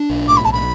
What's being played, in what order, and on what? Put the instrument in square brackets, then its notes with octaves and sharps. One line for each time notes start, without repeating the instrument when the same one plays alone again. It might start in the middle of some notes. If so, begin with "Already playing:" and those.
Already playing: [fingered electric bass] D4
B1
[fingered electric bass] A2 [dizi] D6
[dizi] B5
[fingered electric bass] B1 [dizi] A5
[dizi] B5